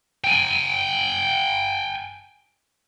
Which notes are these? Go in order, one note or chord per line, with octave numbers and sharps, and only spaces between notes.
G5 G#5